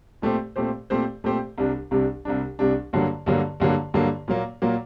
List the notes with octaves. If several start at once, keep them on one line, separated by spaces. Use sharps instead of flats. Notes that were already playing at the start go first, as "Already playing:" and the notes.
A#2 A3 C4 G4 C5
A#2 A3 C4 G4 C5
A#2 A3 C4 G4 C5
A#2 A3 C4 G4 C5
C2 C3 G3 D4
C2 C3 G3 D4
C2 C3 G3 D4
C2 C3 G3 D4
G2 D3 F#3 A#3
G2 D3 F#3 A#3
G2 D3 F#3 A#3
G2 D3 F#3 A#3
A#2 F#3 A#3
A#2 F#3 A#3